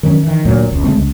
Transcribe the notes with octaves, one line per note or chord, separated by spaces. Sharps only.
D#3 F#3 G#3 C#4
D#3 E3
D2 A#2 F#3
E1 C#2
C#3 G#3 A3 C4
C#2